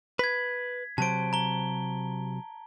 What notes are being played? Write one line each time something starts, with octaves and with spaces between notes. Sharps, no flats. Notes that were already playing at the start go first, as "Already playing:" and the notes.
B4 G#6 B6
C3 F#3 C5 A5 D7
A#5 G7